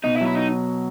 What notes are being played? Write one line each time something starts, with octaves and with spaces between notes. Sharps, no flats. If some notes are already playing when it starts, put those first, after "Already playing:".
B2 D#4
E4
F#3
E4
D#4